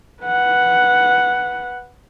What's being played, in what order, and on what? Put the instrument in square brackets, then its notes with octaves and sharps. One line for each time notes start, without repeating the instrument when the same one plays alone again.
[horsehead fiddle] B4 F#5